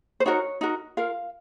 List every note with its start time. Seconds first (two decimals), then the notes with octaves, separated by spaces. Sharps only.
0.20 C5
0.26 D#4 F#4 A#4 C#5
0.61 D#4 F#4 A#4
0.97 F4 A#4 F5